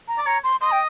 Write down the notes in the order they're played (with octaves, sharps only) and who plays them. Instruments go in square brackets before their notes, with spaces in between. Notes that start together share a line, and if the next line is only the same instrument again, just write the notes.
[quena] A#5
[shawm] D5
[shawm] C#5 [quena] A#5
[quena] C6
[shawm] D#5 [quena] C6
[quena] G5